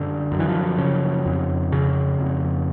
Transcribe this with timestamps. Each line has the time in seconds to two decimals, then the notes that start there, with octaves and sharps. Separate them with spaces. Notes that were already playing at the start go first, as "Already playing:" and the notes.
Already playing: F#2 D3
0.32 F#2
0.39 E3
0.48 F3
0.78 C#3
1.26 F2
1.72 C#3
2.19 F2